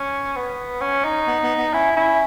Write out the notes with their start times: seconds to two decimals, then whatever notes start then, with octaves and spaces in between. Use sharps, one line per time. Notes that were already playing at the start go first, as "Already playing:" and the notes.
Already playing: C#4
0.36 B3
0.81 C#4
1.05 D#4
1.27 B3
1.43 B3
1.58 B3
1.73 C#4 E4
1.96 C#4 E4